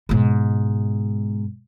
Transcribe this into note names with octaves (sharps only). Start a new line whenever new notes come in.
G#2 B2